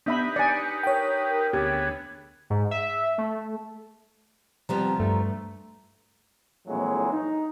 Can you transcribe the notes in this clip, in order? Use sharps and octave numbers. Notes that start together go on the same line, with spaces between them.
B3 D4 D#4 G4 B4 E5 B5
D5 G#5 C#7
A#4 C#5 G5
D2 B3 G4 G#4
G#2
E5
A3
C3 F3 G3 B3 A#5
G2 A3
A#1 F2 A2 E3 F#3 G#3
D#4